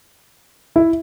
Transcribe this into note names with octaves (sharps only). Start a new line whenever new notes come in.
E4